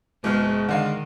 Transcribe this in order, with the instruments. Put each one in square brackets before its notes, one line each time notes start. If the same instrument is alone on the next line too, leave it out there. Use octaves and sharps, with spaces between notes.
[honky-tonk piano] F#1 B2 F6 [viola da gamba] G#3
[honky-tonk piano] D3 G#3 F5 [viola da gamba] D#3